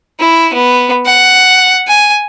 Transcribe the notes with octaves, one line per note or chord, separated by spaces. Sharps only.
E4
B3
F#5
G#5